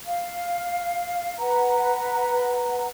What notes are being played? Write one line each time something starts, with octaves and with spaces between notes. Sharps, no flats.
F5
B4 F#5 A#5